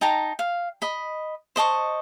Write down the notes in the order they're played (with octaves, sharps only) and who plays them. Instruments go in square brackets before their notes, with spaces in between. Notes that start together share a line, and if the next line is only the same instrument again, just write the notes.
[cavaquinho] D#4 G5 A5 A#5
F5
D#5 B5
C5 D#5 A5 C#6